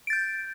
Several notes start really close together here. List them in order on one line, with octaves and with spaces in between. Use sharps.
D7 A6 G6